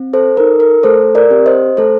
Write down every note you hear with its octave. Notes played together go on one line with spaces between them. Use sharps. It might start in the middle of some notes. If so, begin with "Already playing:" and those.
Already playing: C4
A4 C5
D#4 A4 A#4
A#4
A3 A4 C5
A#4 D5
C4 G4
C5 D#5
A3 A4 C5